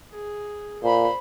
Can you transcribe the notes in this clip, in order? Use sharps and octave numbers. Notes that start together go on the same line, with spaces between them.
G#4
A#2 C5 B5